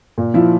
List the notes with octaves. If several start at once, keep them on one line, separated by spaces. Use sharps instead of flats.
A#2
F3 E4